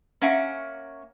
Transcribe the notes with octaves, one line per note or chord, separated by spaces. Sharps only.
A#3 C#4 E5 F#5 G#5